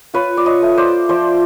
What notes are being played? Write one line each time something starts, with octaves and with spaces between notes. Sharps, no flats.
F4 B4 C#5
D5
C#5 D#5
A3
C5 D5
F3 C5 D5